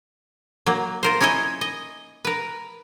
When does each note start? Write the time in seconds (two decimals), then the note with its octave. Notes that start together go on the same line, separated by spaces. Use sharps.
0.66 F#3 A#3
1.03 F4 A#4 C5
1.21 C#4 D#4 E4 C#5 D#5
1.61 D#5
2.25 A#4 B4